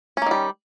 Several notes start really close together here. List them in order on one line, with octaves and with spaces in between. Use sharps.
C#4 A#3 D#3 G3